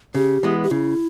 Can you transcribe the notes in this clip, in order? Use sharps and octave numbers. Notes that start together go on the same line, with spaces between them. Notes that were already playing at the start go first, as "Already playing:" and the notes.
C#3 G4
E3 G#3 B3
G4
C#3 E4